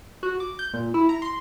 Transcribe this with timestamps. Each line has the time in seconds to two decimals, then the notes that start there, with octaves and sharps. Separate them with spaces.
0.23 F#4
0.40 D6
0.59 G6
0.74 A#2
0.94 E4
1.09 A#5
1.22 C6